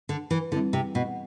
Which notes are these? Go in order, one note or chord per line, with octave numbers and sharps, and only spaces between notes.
D3
E3
D3 G3 C4 E4
C3
B2